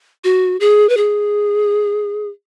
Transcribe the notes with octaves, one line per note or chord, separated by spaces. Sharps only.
F#4
G#4
B4
G#4